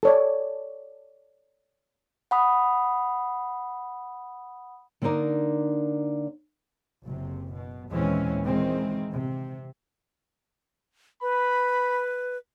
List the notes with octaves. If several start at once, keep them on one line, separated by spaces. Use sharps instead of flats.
A4 C#5 D5
F#5 B5 D#6
D3 A#3 D4 D#4 A#4 D5
F#1 C3
B2
D#2 A#2 E3 G#3 C4 C#4
D#3 E3 G#3 C4
C3
B4 B5